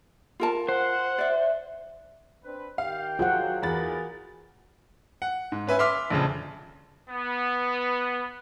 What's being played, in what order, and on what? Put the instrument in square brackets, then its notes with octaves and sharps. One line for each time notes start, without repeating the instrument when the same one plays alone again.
[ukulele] F4 A#4 A5
[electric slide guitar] C5 [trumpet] F#5
[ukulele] D5 E5
[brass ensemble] C4 D4 B4
[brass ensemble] D#3 G4 G5 [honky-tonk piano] F5
[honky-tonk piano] F#3 G#4 C5 [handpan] F4 F#4 F#5
[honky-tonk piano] E2 B5 A6 [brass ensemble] G#4 A#4
[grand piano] F#5
G#2
C#4 B4 E5 G#5
E5 C6 D6 F6 B6
A#1 F2 C#3 A5
[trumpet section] B3